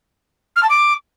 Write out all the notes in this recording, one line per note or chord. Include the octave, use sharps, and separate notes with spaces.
F6
A5
D6